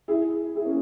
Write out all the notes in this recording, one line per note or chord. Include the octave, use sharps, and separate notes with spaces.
E4 G#4
E4 G#4
A#3 C#4